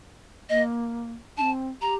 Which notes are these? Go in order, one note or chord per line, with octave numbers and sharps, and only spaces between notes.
A#3 D#5
C4 D4 A5
G4 A#5